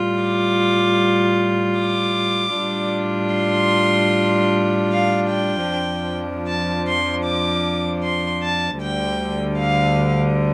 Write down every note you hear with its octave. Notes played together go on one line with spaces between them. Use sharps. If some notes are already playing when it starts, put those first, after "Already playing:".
Already playing: A2 G3 F4
D6
D6
A2 G3 D4 F4
C6
F5
G5
F2 F3 D4
A5
C6
D6
C6
A5
D2 D3 G3 G5
F5